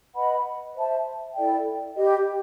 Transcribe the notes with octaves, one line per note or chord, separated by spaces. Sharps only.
B4 D#5 F#5 B5
C5 E5 A5
E4 A4 D5 G5
G4 B4 D#5